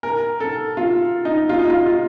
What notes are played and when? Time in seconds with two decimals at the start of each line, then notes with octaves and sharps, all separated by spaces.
0.03 A#4
0.40 A4
0.77 F4
1.25 D#4
1.49 F4
1.59 D#4
1.70 F4
1.86 F4